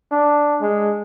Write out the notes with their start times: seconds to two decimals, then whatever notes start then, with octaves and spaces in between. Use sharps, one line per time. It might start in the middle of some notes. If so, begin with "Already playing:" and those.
0.11 D4
0.61 G#3